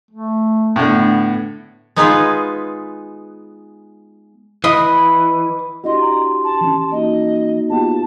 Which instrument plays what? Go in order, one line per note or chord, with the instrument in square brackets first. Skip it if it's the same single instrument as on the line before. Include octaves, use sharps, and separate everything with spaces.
[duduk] A3
[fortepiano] A2 D3 [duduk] B3
[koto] G#3 B3 D#4 F4 G#4 B4
[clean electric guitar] E3 [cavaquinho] D#5 B5
[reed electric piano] D4 E4 F#4 [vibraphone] G4 C6 [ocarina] D#5
[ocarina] A#5
A5
[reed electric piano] E3 C#4
[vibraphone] A#3 D#4 F#4 [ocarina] D#5
[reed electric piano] B3 F4 G4 [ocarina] A5